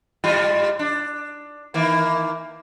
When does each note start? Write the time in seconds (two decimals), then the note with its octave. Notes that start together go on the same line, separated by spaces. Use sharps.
0.24 G#2 G3 F4
0.79 D4
1.74 D#3 E3 A#3